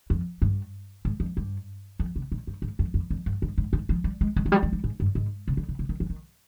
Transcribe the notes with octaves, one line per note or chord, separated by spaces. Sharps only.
F2
G2
G#2
F2
G2
F2
C3
A#2
G2
G#2
F2
F2
F2
G2
G#2
G#2
G#2
F3
G3
G#3
G#3
F3
G3
F3
G3
G#2
G2
G#2
C3
D3
C3
C3
D#3
F3
D#3